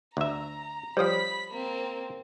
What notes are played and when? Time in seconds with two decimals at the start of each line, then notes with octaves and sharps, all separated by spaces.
0.17 D2 E5 A#5
0.97 F3 G3 C5 C#5 B5 D#6 B6
1.51 A#3 C4